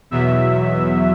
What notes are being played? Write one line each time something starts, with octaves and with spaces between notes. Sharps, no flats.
E2 B2 F#3 E5